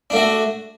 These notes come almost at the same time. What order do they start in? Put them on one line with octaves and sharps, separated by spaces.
D4 A3 F#4